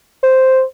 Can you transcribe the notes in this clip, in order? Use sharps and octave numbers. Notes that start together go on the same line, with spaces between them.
C5